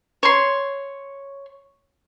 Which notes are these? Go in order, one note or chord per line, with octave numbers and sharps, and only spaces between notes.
C#5 C6